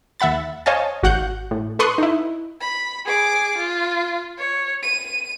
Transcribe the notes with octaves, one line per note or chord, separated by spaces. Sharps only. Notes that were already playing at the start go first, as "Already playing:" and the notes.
D#2 E5 F#5 B5 A6
C5 C#5 D#5 F5 G#5 A5
G#1 F#4 F5 F#5 F#6 G6
A2
A4 B4 C6 C#6 D#6 F#6
D#4 E4
B5
G#4 D6
F4
C#5
D#7